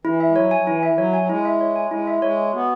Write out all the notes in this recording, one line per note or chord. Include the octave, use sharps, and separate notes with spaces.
E3 E4
E5
G#3
F#3 C#5
G#5
F#3
E3 E4
E5
E3
F#3 C#5
G#5
F#3
G#3 E4
E5
C#5
G#5
G#3 E4
E5
G#3 C#5
G#5
B3 F#4